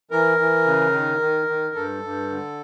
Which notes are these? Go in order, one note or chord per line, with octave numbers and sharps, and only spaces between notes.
E3 A#4
E3
C#3
D#3
D#3
D#3
G2 A4
G2
D3